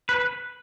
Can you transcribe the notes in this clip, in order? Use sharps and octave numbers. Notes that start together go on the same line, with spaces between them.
B4